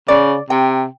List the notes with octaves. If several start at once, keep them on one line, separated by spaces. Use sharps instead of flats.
C#3 D5
C3 G5